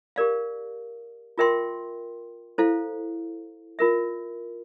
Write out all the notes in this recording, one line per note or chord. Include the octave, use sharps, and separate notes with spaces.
G4 A#4 D5 F5
F4 A#4 E5 G5 C6
E4 A4 C5 F5
F4 A#4 E5